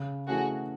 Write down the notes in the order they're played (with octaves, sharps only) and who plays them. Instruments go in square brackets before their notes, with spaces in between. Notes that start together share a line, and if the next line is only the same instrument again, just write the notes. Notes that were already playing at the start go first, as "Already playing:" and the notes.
Already playing: [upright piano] C#3
[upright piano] E3 A3 C#4 [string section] F#4 G#4